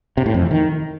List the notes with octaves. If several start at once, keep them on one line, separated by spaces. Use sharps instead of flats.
C3
A2
F2
E3
D#3